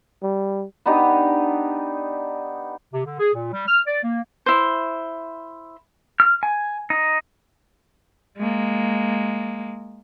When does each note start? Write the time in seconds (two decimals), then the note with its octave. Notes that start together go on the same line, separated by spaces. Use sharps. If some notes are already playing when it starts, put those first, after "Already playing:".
0.23 G3
0.85 B3 D4 D#4 G4
2.93 C3
3.05 D3
3.19 G#4
3.34 A#2
3.53 G3
3.67 F6
3.86 D5
4.03 A#3
4.46 E4 C5
6.20 F6
6.43 G#5
6.90 D#4
8.38 G#3 A#3